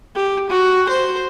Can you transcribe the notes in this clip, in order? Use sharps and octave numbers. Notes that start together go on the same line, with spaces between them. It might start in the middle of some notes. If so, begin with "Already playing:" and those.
G4
F#4
C5